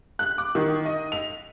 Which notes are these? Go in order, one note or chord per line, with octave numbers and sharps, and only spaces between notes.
F#6
D6
D#3
D#5
F7